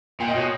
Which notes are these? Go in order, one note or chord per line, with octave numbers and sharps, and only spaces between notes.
A#2 G5
D#5
B2 C#5